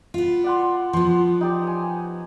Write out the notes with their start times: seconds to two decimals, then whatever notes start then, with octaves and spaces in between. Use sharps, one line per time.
0.14 B3 F4
0.44 D5 F#5 C6
0.93 F3 B3 F#5 C6
1.41 D#4 G4 D5
1.64 C#5 G#5